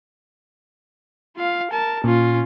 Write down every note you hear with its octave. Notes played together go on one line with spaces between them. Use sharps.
F4 F5
A#4 A5
A#2 C#4 F4